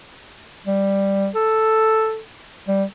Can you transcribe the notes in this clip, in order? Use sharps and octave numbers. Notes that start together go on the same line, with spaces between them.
G3
A4
G3